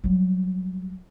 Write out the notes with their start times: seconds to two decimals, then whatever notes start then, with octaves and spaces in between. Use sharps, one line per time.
0.04 F#3 G3